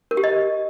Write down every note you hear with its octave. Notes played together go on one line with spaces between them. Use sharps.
A#4
G4
D#5